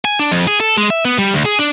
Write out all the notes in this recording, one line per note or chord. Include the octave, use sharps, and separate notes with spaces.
G#5
D4
F2
G#4
A4
G#3
E5
B3
G3
D2
G#4
D4